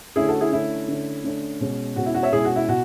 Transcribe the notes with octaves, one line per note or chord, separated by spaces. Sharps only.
D3 A3 C#4 E4 G#4
F#4 A4
E4 G#4
D3 A3 C#4 E4
D3 A3 C#4
D3 A3 C#4
B2 G#3 C#4
B2 G#3 C#4 F#4
E4
F#4
C#5 E5
B2 G#3 C#4 E4 G#4
F#4
E4
B2 F#4